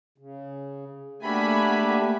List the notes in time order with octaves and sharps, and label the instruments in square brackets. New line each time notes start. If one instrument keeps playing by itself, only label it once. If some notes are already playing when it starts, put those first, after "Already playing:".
[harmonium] C#3
[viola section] A3 A#3 [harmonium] D4 G4 E5 [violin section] F#4 G#5 B5